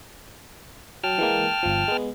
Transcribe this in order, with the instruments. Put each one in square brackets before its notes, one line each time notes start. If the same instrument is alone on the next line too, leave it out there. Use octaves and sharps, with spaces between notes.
[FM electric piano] F#3 [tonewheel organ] G5 A5 F6
[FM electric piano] E3 G#3 A#3
G1 F3
G#3 B3